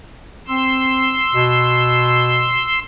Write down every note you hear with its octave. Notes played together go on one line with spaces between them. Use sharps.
C4 C6 E6
B2